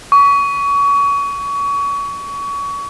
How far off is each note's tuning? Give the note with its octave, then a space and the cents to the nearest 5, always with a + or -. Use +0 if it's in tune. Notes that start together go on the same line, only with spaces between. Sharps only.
C#6 +30